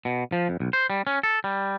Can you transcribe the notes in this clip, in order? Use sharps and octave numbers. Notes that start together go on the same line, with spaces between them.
B2
F3
F2
B1
C5
G3
C#4
A4
G3